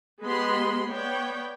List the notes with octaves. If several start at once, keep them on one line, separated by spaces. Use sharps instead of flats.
G#3 B3 G4 D#5 B5 C6
B3 C#5 D5 G5